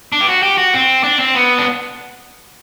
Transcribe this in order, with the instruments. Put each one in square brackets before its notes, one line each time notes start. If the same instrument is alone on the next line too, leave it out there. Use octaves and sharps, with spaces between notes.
[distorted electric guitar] D4
G4
F#4
G4
F#4
C4
D4
C4
B3
D4